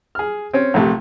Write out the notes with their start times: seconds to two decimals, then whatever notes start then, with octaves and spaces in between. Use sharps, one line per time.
0.15 G#4 F6
0.53 C4 C#4
0.74 A#1 C3 A3